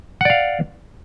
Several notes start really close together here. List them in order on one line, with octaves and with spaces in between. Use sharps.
F#5 D5 F5